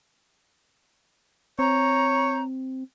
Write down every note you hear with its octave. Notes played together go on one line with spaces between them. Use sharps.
C4 C#5 A#5 G6